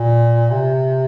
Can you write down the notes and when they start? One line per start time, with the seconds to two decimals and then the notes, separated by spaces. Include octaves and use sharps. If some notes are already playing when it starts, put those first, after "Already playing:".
Already playing: A#2
0.51 C3